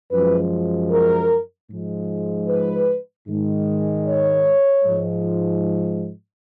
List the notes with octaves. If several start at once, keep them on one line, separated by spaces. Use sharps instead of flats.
F#2 F3 G#3 B4
A#4
G#2 F3 G#3
B4
G#2 D#3 G#3
C#5
G#2 F3 G#3